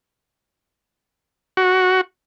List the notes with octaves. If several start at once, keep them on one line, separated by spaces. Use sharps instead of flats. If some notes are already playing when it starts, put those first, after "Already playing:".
F#4